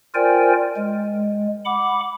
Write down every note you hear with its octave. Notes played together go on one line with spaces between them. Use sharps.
F4 A#4 C5 D5 G5 G#5
G#3
F#5 B5 D6